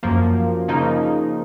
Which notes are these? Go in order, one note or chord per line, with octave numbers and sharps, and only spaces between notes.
F#2 F3 A#3
C#3 F3 A#3 D#4